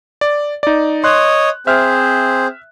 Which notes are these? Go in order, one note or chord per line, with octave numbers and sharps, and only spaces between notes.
D5
D#4 D5
C#5 D#5 C6 F#6
C4 G#4 C5 E5 F6